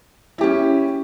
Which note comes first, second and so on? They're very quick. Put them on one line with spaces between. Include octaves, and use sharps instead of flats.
E4 G4 C#4